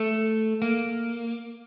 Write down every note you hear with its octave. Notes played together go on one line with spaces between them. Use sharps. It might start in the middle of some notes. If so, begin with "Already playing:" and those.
Already playing: A3
A#3